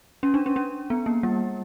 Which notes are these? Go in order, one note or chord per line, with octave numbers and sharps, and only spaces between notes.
C#4
D4
C#4
C#4
B3
A#3
G3